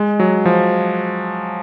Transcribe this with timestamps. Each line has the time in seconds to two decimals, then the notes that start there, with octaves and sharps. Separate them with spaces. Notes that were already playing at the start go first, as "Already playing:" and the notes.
Already playing: G#3
0.20 F#3
0.45 F3